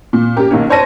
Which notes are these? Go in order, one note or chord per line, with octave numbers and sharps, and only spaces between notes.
A#2
C#4 G4 A#4
B1 D#3 A#3 C#4
C5 C#5 A5 A#6 D#7